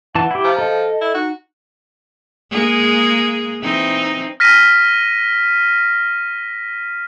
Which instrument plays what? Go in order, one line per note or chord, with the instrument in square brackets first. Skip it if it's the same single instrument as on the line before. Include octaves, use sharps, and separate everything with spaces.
[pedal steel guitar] E3 A5 [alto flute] F#5
[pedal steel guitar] E4 G4
[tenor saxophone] F3 [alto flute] A#5
[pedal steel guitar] A4 [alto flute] D#5
[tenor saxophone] E4
[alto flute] D#4 [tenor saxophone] F#4
[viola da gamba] G#3 A#3 G#4
E3 C4 D#4
[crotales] F6 A#6 B6 D#7